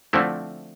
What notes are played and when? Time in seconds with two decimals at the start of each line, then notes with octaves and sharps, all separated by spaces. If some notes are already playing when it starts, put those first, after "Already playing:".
0.13 D3 F3 A3 C4 E4